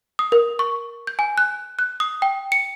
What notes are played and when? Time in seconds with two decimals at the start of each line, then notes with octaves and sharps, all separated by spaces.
0.19 D#6
0.32 A#4
0.59 C#6
1.07 G6
1.19 G#5
1.38 F#6
1.79 F#6
2.00 D#6
2.22 G5
2.52 C#7